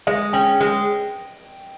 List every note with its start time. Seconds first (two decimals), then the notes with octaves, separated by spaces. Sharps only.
0.07 G#3 D#5
0.33 C#4 G5
0.61 G#3 G5